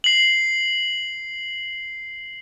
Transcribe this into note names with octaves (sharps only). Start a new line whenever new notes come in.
C7 F#7